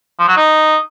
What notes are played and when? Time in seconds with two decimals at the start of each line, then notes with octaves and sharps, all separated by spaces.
0.19 F3
0.28 F#3
0.37 D#4